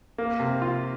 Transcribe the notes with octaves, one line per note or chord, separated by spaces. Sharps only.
A#3
C3
F4